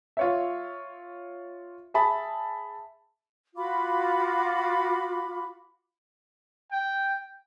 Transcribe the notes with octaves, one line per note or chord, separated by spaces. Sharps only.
F4 C#5 E5
G#4 E5 A5 B5
F4 F#4 B5 D6
G5